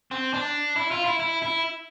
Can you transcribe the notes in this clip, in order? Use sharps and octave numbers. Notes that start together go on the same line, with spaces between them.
C4
D4
E4
F4
E4
E4
E4